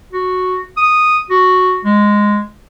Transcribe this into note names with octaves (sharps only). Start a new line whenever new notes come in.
F#4
D#6
F#4
G#3